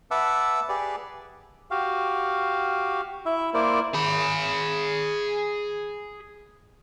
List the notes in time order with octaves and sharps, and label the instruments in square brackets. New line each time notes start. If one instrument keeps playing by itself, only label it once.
[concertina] B4 E5 F#5 A5 D6 E6
G4 G#4 B4 D5
F#4 G4 F5
E4 E5
A#3 E4 A#4 C5 D5
[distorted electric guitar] G#4 B5